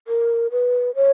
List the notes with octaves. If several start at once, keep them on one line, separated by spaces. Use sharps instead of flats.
A#4
B4
C#5